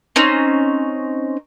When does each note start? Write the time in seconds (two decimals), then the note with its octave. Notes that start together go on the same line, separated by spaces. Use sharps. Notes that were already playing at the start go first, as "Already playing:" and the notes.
0.16 C4 C#4 D#4